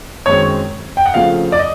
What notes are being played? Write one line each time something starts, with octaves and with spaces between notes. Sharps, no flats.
F#2 D#3 G#3 C4 C#5
G5
F#5
C#3 F3 A3 C4 F5
D5
D#5